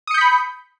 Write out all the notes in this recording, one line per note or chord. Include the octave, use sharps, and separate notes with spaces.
B5 D#6 G6 B6 C#7